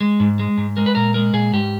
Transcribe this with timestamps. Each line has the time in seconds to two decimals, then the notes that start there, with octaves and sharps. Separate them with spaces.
0.01 G#3
0.20 G#2
0.39 G#3
0.58 G#2
0.77 G#3 A#4
0.86 B4
0.95 A#2 A#4
1.14 G#3 A#4
1.33 A#2 G#4
1.53 G#2 G4